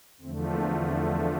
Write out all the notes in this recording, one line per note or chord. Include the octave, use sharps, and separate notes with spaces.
E2 D3 F3 A3 C4
A#3
C4